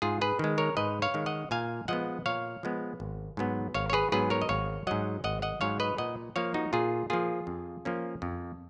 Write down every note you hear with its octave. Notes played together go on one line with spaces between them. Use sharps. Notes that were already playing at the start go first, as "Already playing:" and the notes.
G#2 F4 G#4
G#4 B4
D#3 G#3
A#4 C#5
G#2 B4 D#5
C#5 F5
D#3 G#3
D#5 F#5
A#2 F5 G#5
F3 G#3 B3 D#5 F#5
A#2 C#5 F5
F3 G#3 B3
G#1
G#2 F#3 B3
G#1 C#5 F5
C#5
G#4 B4
G#2 F#3 B3 G#4 B4
A#4 C#5
D#5
G#1 C#5 F5
G#2 F#3 D#5 F#5
G#1 D#5 F#5
D#5 F#5
G#2 F#3 C#5 F5
B4 D#5
A#2 D#5 F#5
F3 A#3 C#5 F5
D#4 F#4
A#2 F4 G#4
F3 A#3 F4 G#4
F2
F3 A#3 C#4
F2